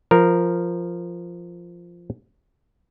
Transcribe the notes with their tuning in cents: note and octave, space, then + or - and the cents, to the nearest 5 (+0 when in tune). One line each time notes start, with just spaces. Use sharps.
F3 -10 A#4 +0